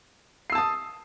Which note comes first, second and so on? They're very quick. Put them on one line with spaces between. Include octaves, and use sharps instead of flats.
C7 E6 A5 D#6